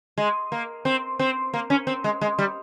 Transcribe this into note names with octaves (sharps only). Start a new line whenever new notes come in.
G#3
A#3
C4
C4
A#3
C#4
C4
G#3
G#3
G3